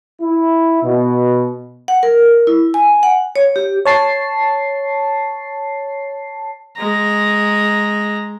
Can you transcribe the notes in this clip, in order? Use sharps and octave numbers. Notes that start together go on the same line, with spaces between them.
E4
B2
F#5
A#4
E4
G#5
F#5
C#5
G4
C#5 A5 C7
G#3 A#5